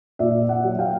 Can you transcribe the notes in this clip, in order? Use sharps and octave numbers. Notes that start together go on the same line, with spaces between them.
A#2 D5 E5
E5 F#5
F#3
F5 G5